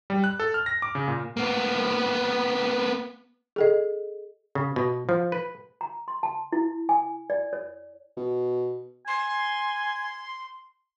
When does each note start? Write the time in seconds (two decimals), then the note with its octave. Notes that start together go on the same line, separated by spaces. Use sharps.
0.10 G3
0.24 F#6
0.40 A4
0.54 F6
0.66 A#6
0.82 D6
0.95 C#3
1.08 A#2
1.37 A#3 B3
3.56 G#4 A4 D#5
4.55 C#3
4.76 B2
5.09 F3
5.32 B4
5.81 A#5
6.08 C6
6.23 A5
6.52 E4
6.89 G#5
7.30 D5
7.53 C#5
8.17 B2
9.07 G#5 C6